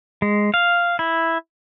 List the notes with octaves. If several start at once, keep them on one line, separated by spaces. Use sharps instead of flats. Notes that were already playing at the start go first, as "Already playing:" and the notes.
G#3
F5
E4